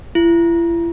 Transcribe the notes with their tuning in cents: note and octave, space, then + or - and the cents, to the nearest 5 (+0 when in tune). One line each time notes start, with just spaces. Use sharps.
E4 +40